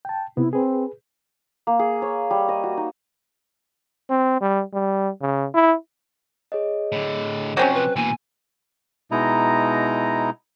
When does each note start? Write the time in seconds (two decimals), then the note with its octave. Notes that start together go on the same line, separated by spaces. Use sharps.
0.05 G5 A5
0.37 C3 B3 E4
0.53 C4 G#4 B4
1.67 A#3
1.79 G#4
2.02 C#5
2.30 G3
2.49 D#5
2.64 F#4
2.77 D#4
4.10 C4
4.41 G3
4.74 G3
5.21 C#3
5.54 E4
6.52 G#4 C#5 D#5
6.92 A2 D3
7.57 C3 F3 F#3 C4 C#4 C5
7.75 B4
7.96 B2 E3 A#3 G#5
9.11 B2 G#3 D#4 E4 D#5 A#5